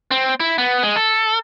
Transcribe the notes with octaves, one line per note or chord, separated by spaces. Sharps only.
C4
E4
B3
G#3
A4